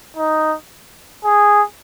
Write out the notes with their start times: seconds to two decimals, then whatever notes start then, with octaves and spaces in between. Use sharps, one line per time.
0.17 D#4
1.25 G#4